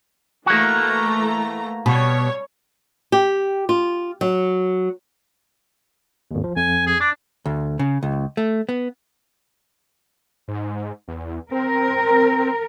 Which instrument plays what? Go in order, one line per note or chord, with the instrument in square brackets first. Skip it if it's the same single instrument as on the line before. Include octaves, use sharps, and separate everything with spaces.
[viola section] E3 A3 A#5 [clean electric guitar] A#3 F#4
[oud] B2 [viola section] G3 C#5
[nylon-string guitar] G4
F4
F#3
[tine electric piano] G#1 D#2
F3
[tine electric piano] F2 [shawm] G#5
[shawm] G#4
[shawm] D4 [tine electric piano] D6
[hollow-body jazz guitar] D2
C#3
C#2
A3
B3
[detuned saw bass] G#2
E2
[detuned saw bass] C4 [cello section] A#4